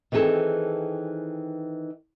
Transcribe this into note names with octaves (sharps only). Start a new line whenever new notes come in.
D#3 E3 C4 G#4 A4